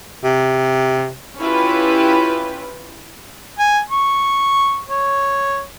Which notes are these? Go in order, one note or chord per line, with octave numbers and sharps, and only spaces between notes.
C3
C#4 E4 F4 G4 B4
G#5
C#6
C#5